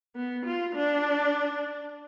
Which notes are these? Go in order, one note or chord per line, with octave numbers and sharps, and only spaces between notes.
B3
F4
D4